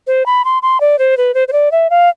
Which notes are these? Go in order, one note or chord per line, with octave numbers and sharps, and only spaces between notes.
C5
B5
C6
C6
D5
C5
B4
C5
C5
D5
E5
F5